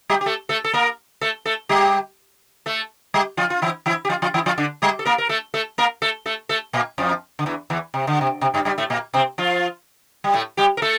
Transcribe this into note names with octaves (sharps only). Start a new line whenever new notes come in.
G3 G4
G4
A3 A4
A3 A4
A4
A#3 A#4
A3 A4
A3 A4
G3 G4
A3 A4
G3 G4
F3 F4
F4
E3 E4
E3 E4
G4
F3 F4
F3 F4
E3 E4
F3 F4
D3 D4
G3 G4
A4
A#3 A#4
A#4
A3 A4
A3 A4
A#3 A#4
A3 A4
A3 A4
A3 A4
A#2 A#3
F2 F3
D3
E2 E3
E2 E3
C3
D3
C3
C3
G2 G3
G2 G3
A2 A3
A#2 A#3
C3 C4
F3 F4
G3
A2 A3
G3 G4
A#4
A3 A4